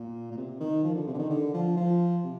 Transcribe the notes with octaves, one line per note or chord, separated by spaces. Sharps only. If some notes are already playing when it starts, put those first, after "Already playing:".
Already playing: A#2
A#2
C3
D#3
F3
D3
C3
D3
D#3
D3
F3
F3
C3